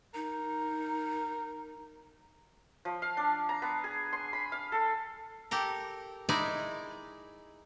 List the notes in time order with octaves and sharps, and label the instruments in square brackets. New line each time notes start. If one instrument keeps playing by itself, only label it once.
[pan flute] D#4 [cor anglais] A#4
[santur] F3
F5
D4
A#5
B3
G#4
C6
B5
F5
A4
[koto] G4 A4 A#4
G#3 D#4 E4 D5 G#5